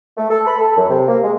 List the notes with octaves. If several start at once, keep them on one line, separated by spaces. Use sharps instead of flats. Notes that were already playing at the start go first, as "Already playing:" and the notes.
A3
A4
B5
A4
F#2
C3
A#3
G#3